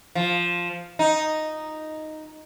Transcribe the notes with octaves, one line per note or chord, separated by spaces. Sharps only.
F3
D#4